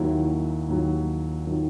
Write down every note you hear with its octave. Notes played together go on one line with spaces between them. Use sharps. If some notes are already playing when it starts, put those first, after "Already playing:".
Already playing: D#2 D#3 F#3 E4
D#2 D#3 F#3
D#3 F#3